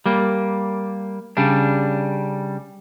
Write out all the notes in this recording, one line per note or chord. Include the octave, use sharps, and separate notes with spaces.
G3 A#3
C#3 G3 D4